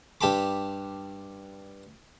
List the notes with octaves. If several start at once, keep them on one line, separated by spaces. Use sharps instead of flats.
G2 G4 A5 B5 D6